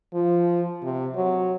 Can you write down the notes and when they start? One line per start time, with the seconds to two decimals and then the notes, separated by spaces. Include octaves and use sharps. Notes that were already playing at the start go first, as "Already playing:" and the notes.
0.14 F3
0.84 C3
1.16 F#3